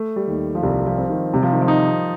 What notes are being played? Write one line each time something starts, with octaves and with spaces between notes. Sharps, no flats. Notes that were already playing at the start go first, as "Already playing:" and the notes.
Already playing: A3
G3
D#2
F3
C2 G3
F3
C4
D#3
C3 G3
F3
D#3
F3
D#4